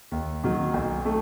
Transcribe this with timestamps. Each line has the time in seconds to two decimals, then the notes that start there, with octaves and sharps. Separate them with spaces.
0.12 D#2
0.44 D#3 F#3
0.74 B1
1.05 A3